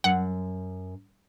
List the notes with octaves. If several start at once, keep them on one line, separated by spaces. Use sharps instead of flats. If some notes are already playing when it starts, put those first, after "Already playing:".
F#2 F#5